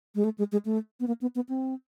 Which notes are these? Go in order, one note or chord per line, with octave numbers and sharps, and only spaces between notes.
G#3
A3
G#3
G#3
A3
B3
A#3
B3
B3
C4